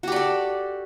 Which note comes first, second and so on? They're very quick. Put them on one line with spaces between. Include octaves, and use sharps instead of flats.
F#4 G4 D5 A4